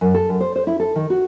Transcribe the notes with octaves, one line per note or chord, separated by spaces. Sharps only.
F#2
A4
F#2
C5
C5
E4
A4
D#3
F#4